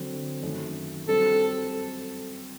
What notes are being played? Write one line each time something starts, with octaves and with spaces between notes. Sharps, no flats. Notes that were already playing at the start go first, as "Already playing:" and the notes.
Already playing: D3 F#3 C4
F#2 D#3 A3
G2 F#3 C4 G4 A4